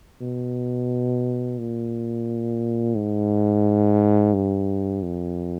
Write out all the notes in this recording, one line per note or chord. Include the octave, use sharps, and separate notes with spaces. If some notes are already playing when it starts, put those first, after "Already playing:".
B2
A#2
G#2
G2
F2